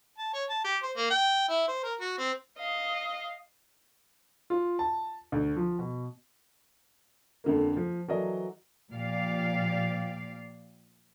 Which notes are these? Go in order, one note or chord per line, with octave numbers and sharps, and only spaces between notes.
A5
C#5
A5
G4
C5
A#3
G5
E4
C5
A#4
F#4
C4
D#5 F5
F4
A5
D2
F3
B2
F2 D3 A#3
F3
E3 F#3 A4 A#4 D5 D#5
A#2 F3 G4 D5 F5